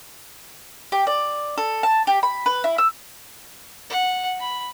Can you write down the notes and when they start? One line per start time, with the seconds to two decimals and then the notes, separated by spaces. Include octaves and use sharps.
0.92 G4
1.07 D5
1.58 A4
1.83 A5
2.07 G4
2.23 B5
2.46 B4
2.64 E4
2.78 E6
3.90 F#5
4.40 B5